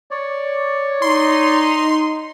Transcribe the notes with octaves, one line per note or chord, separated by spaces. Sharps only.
C#5 D5
D#4 C6